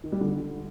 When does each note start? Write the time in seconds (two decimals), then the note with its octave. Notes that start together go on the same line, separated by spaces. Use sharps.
0.04 D#3
0.12 G3
0.21 D3